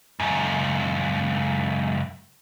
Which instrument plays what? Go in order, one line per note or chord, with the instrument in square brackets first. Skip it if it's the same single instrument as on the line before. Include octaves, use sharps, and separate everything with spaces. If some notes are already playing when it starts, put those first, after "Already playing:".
[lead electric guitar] C#2 F#2